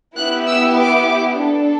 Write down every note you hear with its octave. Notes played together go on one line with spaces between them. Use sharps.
B3 E4 G4 F#6
E6
D6
D4 A4